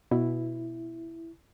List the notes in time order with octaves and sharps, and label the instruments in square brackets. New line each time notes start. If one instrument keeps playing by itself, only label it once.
[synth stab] B2 [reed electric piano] E4